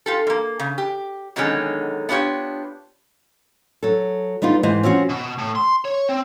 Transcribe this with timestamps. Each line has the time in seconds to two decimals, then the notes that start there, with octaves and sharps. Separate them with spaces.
0.06 F4 G4 A4
0.27 A2 A#3
0.59 C#3
0.78 G4
1.36 B2 D3 D#3 F#3 G#3 C#4
2.09 B3 D4 F4 G4 C#5
3.83 F#3 A4
4.42 G3 B3 D#4 F4
4.63 G#2 E3 G4 C5 D#5
4.83 F3 C4 C#4 F#4
5.09 B2
5.38 A2
5.56 C6
5.85 C#5
6.09 C4